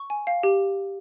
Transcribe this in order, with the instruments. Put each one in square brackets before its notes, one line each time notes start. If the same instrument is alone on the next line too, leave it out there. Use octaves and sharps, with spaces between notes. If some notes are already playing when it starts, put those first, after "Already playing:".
Already playing: [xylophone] C#6
G#5
F5
G4